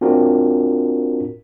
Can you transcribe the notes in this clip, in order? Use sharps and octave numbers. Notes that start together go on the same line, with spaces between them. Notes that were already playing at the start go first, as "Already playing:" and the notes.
C4 D4 F4 F#4 A#4